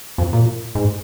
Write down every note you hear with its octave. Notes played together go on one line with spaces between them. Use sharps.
F2
A#2
G#2